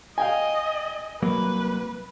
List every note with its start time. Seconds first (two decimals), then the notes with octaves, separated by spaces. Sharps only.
0.18 D#5 F5 G5 G#5
1.22 C2 F#3 A#3 B4